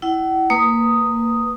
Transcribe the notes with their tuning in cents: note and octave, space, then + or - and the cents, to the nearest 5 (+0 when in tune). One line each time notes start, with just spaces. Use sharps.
E4 +0 F#5 +40
A#3 -20 B4 +0 D#6 +0